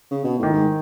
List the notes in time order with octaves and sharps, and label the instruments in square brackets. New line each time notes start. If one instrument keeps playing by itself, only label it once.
[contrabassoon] C#3
B2
[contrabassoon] A2 [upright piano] D#3
[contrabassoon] G#2